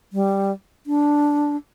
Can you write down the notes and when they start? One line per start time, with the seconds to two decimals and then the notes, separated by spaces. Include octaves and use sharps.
0.13 G3
0.87 D4